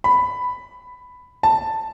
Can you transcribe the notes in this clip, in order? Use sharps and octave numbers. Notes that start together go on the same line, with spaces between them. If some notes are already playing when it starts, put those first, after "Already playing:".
B5
A5